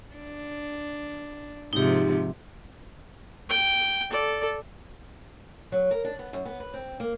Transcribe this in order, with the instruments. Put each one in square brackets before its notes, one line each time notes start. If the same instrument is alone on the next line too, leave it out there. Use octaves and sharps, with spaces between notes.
[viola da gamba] D4
[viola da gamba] G#2 C3 F3 [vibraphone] D#4 G4
[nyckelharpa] G5
A4 D5
[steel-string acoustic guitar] F#3
A#4
D4
B3
F#2
B3
B4
C4
A#3